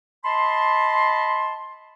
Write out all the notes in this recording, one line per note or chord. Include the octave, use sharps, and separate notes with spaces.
D#5 A5 B5 C6